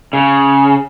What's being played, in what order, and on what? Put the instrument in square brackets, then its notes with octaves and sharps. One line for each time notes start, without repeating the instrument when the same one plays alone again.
[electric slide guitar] C#3